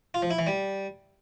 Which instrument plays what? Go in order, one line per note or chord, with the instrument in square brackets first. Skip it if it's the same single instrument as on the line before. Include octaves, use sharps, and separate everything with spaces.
[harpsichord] F4
F3
E4
E3
G3